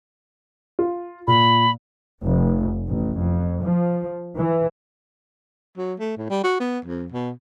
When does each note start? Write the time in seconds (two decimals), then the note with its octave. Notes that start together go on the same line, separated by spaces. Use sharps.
0.79 F4
1.27 A#2 B5
2.24 F1
2.87 A1
3.19 F2
3.61 F3
4.37 E3
5.78 F#3
6.00 A3
6.18 A2
6.30 G3
6.44 F#4
6.60 B3
6.85 F2
7.12 B2